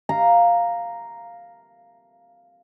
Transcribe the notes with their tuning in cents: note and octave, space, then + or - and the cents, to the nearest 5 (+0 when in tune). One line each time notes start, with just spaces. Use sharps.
F5 +0 A#5 +0